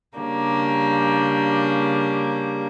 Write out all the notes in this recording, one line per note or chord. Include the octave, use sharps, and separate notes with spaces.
C#3 G3 A#3 D4